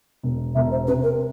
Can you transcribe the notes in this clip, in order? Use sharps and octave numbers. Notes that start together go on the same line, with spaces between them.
E1
E1 E5
C5
C3 B4
A#4